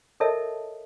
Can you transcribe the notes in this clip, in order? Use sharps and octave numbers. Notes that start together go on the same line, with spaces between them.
A4 A#4 C#5 D#5 E5 A5